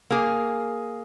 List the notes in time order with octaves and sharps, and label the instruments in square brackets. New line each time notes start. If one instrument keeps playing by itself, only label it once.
[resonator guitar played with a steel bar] A#3 G#4